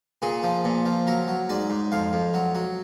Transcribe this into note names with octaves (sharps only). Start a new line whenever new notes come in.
A#2 G#4
F3
A#2
F3
F#3 A#4
F#3
G#2 D5
G#2
F2 F5
F2
F#3
F#3